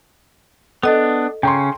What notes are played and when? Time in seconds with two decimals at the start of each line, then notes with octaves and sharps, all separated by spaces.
0.83 B3 D4 A4 D#5
1.43 C#3 C#4 G5 A#5 C6